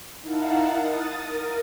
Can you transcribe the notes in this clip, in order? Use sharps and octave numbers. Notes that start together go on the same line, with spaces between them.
D#4 E4 A#4 F5 F#5 A5
D#6 A6
A#4